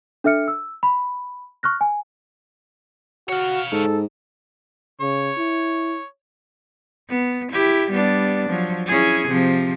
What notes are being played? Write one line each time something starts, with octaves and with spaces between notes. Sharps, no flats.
D4 A4 E5 F6 C#7
E6
B5
C#6 F6 F#6 A#6
G#5
F#4 C#5 F5
G#2 A4
C#3 C#5
E4
B3
E4 G4
G3 B3 D4
F3 F#3
C#4 E4 G#4
C3 F3